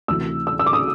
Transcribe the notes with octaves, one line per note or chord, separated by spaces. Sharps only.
D2 C3 E3 E6
E6
E6
D6
D#6